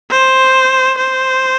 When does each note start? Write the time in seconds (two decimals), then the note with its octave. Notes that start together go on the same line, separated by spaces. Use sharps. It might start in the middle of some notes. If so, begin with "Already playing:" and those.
0.11 C5
0.98 C5